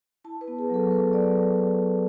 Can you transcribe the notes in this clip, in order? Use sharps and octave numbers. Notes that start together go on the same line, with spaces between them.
E4 A5
B4
B3
G#4
F#3 A4
F#3 B4
F#3 D5